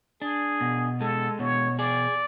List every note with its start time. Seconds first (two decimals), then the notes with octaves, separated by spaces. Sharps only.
0.22 D4 G#4
0.61 B2
1.01 G#3 A4
1.39 B2 C#5
1.79 G#4 D5